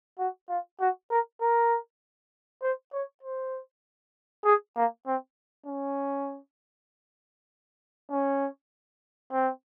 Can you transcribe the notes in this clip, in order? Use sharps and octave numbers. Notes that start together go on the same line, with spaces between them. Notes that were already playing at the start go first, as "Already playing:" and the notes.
F#4
F4
F#4
A#4
A#4
C5
C#5
C5
G#4
A#3
C4
C#4
C#4
C4